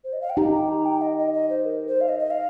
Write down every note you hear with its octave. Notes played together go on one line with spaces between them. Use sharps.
C5
D#5
F5
G5
D#4 G4 A#5
G5
A#5
G5
D#5
D#5
D#5
C5
A#4
C5
F5
D#5
D#5
F5